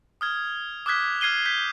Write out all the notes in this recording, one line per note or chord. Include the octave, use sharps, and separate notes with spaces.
D#6 F6 G#6
D6 D#6 F6 F#6 G#6 B6
F6 G#6 C7 D#7 G7
G6 B6